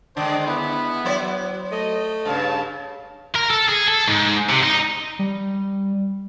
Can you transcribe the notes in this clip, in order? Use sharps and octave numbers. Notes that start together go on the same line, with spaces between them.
D3 G#3 D4 C5 D5 D#5
B3 E4
F#3 C5 D5
A3 D#5
G2 C#3 F5 A5
A#4
A4
G#4
A4
G#2
C3
D#4
G3